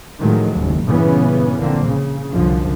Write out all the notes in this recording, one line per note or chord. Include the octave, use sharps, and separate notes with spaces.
A2 D#3 F3 F#3 G#3 A3
F#1 D#2 A2
G2 A#2 C#3 E3 B3 C#4
A#1 D3 A#3 C4
C#3
C2 F#2 D3 F3